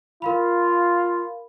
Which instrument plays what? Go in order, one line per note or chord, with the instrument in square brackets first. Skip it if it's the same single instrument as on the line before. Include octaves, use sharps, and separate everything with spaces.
[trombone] F4 [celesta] A#4 F5 B5